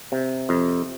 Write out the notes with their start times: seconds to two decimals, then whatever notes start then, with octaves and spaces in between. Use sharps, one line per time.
0.12 C3
0.49 F2